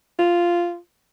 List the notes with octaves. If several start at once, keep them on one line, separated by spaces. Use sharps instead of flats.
F4